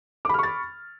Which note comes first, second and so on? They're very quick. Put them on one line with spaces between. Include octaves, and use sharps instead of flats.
D6 B5 F6 C#6 A6